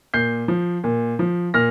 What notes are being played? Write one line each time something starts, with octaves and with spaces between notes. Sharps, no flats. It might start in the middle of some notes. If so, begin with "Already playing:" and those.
A#2 G6 C7
F3
A#2
F3
A#2 F6 A#6